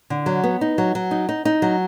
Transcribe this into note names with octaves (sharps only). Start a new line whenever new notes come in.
D3
F#3
B3
D#4
F#3
F#3
D#4
D#4
D#4
F#3